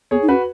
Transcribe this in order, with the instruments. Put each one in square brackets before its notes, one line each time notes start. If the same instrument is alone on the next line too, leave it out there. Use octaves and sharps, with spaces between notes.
[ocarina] B3 [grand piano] G#4 C#5
[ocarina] D#4
[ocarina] C#4 [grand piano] F#4 B4